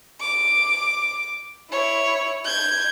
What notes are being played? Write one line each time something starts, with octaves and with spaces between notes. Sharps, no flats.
D6
E4 C#5
G6 G#6